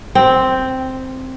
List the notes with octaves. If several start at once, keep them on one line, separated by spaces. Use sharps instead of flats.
C4